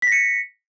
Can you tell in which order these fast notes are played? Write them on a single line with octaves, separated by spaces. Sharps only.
B6 A#6 C#7